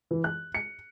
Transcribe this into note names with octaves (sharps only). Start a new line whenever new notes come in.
E3
F#6
C#7